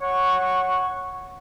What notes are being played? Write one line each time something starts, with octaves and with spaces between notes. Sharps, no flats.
C#5 F#5 C#6